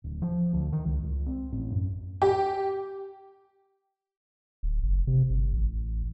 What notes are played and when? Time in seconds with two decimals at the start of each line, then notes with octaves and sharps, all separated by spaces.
0.04 D1
0.22 F3
0.53 D2
0.72 D#3
0.85 C#2
1.04 C#2
1.26 C4
1.52 A1
1.71 F#2
2.22 G4
4.63 D1
4.83 F#1
5.07 C3
5.30 G1
5.53 A1